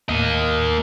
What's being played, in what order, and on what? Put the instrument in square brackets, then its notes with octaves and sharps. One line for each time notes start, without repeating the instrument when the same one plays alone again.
[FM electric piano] D#2 A2 [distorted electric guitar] A#3 D#5